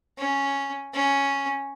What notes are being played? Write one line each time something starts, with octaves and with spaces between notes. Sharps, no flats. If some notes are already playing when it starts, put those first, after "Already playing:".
C#4
C#4